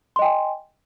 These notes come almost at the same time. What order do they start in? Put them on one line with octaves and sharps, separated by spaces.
C6 D#5 G5 G#5